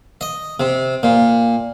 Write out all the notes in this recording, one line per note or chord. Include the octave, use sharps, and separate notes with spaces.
D#5
C3
A#2